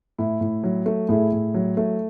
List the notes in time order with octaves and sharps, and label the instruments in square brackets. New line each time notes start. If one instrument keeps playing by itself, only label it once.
[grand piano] A2 E4
A2
F#3
A3
A2 E4 G#4
A2
F#3
A3